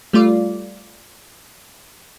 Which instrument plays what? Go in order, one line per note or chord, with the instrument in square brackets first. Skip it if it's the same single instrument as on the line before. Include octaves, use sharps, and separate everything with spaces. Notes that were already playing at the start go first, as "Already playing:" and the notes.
[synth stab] G3 A3 F4 D5